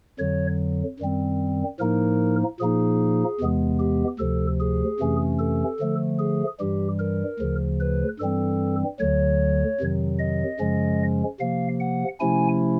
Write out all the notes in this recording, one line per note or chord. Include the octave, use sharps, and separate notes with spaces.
F2 D3 F#3 C#5
F#2 D#3 G3 C4
A2 F3 A#3 D#4 A#4
A#2 F3 A#3 D#4 G#4
E2 C3 E3 G#3 B3
G4
D2 C3 F3 A4
G#4
F2 C3 E3 A3 C#4
A4
D3 F3 A3
G#4
G2 E3 G3 G4
A#4
D2 C#3 F3
B4
G2 E3 G3 C4 A4
D2 D3 F#3 C#5
F2 C3 D#3 F#3
D#5
F#2 C#3 F3 G#3 C#4
C3 F3 A#3 F5
F#5
C3 F3 A3 C#4 E4 G#5